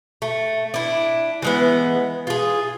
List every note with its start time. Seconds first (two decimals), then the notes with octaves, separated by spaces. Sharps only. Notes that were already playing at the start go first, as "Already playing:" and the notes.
0.22 A3
0.74 D4 E4
1.42 E3 G#3 B3
2.27 F4 G#4